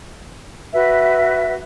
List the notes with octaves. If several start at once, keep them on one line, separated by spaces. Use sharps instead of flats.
F#4 B4 E5